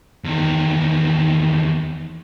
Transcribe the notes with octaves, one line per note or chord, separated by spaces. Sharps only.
E2 D#3